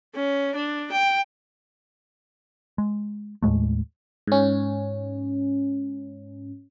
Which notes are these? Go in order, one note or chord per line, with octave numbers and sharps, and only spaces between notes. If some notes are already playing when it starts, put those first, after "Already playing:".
C#4
D4
G5
G#3
D#2 A2 G#3 A3
G#2 C#4